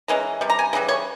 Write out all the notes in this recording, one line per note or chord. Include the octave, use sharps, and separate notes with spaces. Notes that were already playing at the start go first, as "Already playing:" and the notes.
E3 G#3 C#4 A#5
C3 G3
A#5
G#5
C#3 E3 G3 A#5
C#5